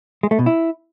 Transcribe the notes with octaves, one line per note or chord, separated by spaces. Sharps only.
G#3
A3
B2
E4